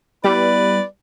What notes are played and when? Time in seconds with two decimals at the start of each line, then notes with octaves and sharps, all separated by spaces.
0.24 G3 B3 E4 B4 D5